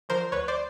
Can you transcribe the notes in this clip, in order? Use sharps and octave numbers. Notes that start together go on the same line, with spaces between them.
D3 F3 A#4 C5
D2 B4 C#5
C5 D5